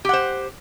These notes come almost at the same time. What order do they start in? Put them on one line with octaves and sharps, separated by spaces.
G4 F#5 C5